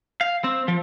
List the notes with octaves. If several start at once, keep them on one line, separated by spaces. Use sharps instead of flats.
F5
C4
F3